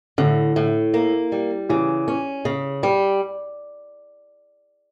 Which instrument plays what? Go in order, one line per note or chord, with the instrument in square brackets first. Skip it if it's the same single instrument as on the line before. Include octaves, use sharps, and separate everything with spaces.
[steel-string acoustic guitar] A2 [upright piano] D3
[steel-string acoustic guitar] A2
A#3
G3
[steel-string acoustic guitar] C#3 [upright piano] E3
[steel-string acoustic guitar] C#4
C#3
G3